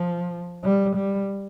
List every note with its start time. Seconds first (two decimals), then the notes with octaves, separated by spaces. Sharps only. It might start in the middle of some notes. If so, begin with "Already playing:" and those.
Already playing: F3
0.64 G3
0.96 G3